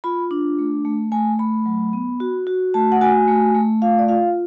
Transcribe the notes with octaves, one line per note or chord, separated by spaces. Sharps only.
F4 B5
D4
A3
A3
A3 G#5
A3 B5
F#3
B3
F#4
F#4
A3 A5
F#5
F#4 G#5
A3
A3
F4 F5
D5
F4 F5